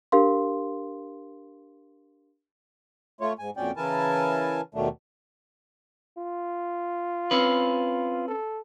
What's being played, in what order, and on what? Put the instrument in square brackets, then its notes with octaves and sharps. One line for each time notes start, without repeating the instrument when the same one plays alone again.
[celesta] D4 G4 A#4 F5 C6
[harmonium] A3 F4 C#5
G#2 G#5
F2 A#2 F#3 C#4 D5 G5
C#3 E3 E4 A#4 G#5 A5
D#2 B2 D#3 F#3 A3 D4
[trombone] F4
[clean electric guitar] C4 C#4 B4
[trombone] A4